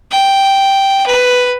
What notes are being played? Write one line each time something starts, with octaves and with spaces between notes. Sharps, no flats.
G5
B4